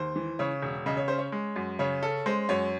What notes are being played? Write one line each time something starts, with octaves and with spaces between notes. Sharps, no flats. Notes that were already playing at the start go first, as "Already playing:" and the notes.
Already playing: D#2 C5
E3
C#3 C#5
E1
C#3 D#5
C#5
C#4 C5
C#5
G#3
F#2
C#3 C#5
C#4 A4
G#3 C5
F#2 C#5